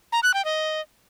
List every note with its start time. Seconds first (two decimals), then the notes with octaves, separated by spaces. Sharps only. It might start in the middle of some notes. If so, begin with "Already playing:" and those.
0.12 A#5
0.23 F#6
0.34 G5
0.45 D#5